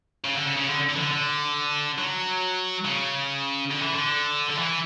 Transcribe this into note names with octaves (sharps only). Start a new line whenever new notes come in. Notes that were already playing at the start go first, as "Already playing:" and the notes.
C#3
D3
C#3
C#3
D3
D3
E3
D3
D3
F#3
C#3
D3
E3
D3
D3
E3